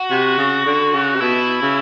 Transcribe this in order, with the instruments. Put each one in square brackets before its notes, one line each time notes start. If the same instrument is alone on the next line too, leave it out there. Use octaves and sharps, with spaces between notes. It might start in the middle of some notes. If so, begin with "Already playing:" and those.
Already playing: [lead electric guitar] F#4
[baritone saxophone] C3
C#3
D3
C#3
C3
[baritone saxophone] B2 [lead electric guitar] E4
[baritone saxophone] C#3